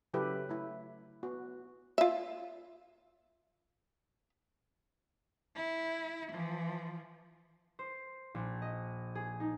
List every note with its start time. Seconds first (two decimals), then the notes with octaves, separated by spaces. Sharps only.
0.14 C#3 F#3 E4 G4 A4 B4
0.49 A3 E4
1.23 B3 F#4
1.98 F4 E5
5.56 E4
6.32 E3 F3
7.79 C5
8.35 A#1
8.62 D#5
9.15 G#4
9.40 D#4